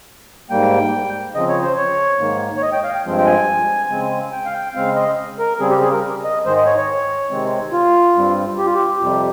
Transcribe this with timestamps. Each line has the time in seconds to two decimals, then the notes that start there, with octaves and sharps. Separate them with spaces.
0.50 G#2 G3 A#3 G5
1.35 C#3 F3 C4 D#5
1.49 C#5
1.63 C5
1.77 C#5
2.19 G#2 D#3 A#3
2.57 C#5
2.62 D#5
2.72 G5
2.84 F5
2.95 G5
3.05 G2 F3 G#3 C4
3.18 G5
3.26 G#5
3.90 C#3 G#3 C4
4.32 G5
4.45 F5
4.54 G5
4.75 C#3 G#3 C4 F5
4.96 D#5
5.39 A#4
5.60 C#3 G3 C4 G#4
5.70 G4
5.81 G#4
5.92 A#4
6.24 D#5
6.45 G#2 D#3 G#3 C5
6.56 D#5
6.66 C#5
6.77 C#5
7.30 C3 D#3 G#3 C4
7.73 F4
8.15 G2 G3 C4
8.58 G4
8.66 F4
8.74 G4
9.00 F2 C3 G3